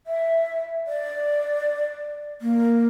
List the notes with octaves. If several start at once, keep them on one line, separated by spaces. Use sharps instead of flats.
E5
D5
A#3